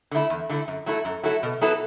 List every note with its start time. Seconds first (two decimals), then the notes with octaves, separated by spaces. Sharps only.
0.11 D3 A3 E4
0.30 E2
0.49 D3 A3 E4
0.68 F#2
0.86 F#3 A3 E4 A4
1.05 F#2
1.23 F#3 A3 E4 A4
1.43 B2
1.61 F#3 B3 E4 A4